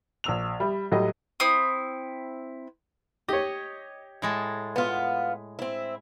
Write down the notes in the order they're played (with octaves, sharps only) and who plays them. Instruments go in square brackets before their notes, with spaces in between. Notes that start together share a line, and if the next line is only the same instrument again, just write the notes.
[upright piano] A#1 E6 F7
G3 E5 B5
A2 F#3 G3 G4 D#5
[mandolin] C4 E4 D#6
[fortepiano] G4 C#5 [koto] D#5
[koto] A2 G#3 A5
[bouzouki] B3 F4
C4 E4